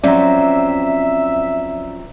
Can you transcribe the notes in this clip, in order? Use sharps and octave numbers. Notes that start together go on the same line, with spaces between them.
F3 F#3 C4 C#4 D5 E5 A#5